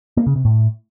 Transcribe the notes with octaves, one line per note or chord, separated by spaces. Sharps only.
A#3
C#3
C3
A2